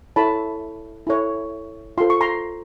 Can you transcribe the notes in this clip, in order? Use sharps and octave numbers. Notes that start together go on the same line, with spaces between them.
E4 A4 C#5 A5 B5
E4 A4 C#5
F4 A4 C5 C6
C#6
A#5 C6